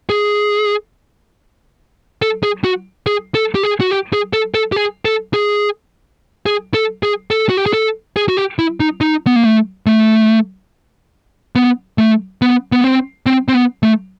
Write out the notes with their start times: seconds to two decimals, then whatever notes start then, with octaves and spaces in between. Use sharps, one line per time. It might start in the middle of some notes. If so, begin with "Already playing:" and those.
0.10 G#4
2.22 A4
2.43 G#4
2.64 F#4
3.06 G#4
3.35 A4
3.55 G4
3.64 G#4
3.80 F#4
3.91 G4
4.13 G#4
4.33 A4
4.54 A4
4.72 G4
4.76 G#4
5.05 A4
5.34 G#4
6.46 G#4
6.74 A4
7.03 G#4
7.31 A4
7.49 F#4
7.57 G4
7.66 G#4
7.73 A4
8.16 G#4
8.29 F#4
8.37 G4
8.59 E4
8.80 D#4
9.01 D#4
9.27 B3
9.36 A#3
9.44 A3
9.86 A3
11.55 B3
11.98 A3
12.42 B3
12.72 B3
12.84 C4
13.26 C4
13.48 C4
13.54 B3
13.83 A3